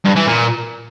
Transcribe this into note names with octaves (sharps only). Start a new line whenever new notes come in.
G2
E3
A#2